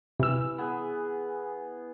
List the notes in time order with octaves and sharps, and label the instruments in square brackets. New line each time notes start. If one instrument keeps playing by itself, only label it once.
[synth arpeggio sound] C3 E6 [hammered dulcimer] E3
[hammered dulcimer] B3 G#4